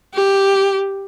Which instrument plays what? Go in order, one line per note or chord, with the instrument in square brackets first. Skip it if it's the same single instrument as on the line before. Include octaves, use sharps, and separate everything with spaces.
[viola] G4